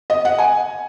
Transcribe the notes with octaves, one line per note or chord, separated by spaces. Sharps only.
D#5
F#5
G#5